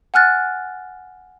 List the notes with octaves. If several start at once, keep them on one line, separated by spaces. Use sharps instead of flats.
F#5 G#5 F6 F#6 A6